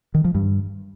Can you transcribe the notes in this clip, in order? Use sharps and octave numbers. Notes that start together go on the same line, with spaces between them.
D#3
F3
G2